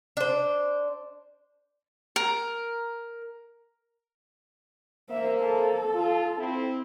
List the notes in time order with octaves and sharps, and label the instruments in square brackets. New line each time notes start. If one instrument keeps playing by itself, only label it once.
[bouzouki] D4 C5
[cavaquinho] A#4
[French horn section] A#3 C5 [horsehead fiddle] E5
[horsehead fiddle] A4
[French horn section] F4
C4 E4